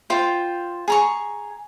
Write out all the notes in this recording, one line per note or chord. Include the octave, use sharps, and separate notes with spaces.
F4 C5 G5
G#4 A#5 C#6